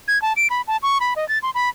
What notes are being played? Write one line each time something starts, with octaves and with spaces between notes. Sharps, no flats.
G#6
A5
D7
B5
A5
C#6
B5
D#5
A6
C6
B5